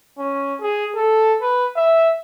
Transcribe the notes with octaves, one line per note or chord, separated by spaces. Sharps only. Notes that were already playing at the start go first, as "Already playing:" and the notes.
C#4
G#4
A4
B4
E5